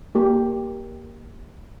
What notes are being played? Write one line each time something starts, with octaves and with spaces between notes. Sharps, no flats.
A#3 G4